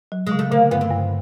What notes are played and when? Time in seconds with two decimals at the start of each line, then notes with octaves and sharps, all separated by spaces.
0.12 F#3
0.27 C#3 G#3
0.39 A3
0.51 D3 A#3
0.71 G2 B3
0.81 C4
0.90 G2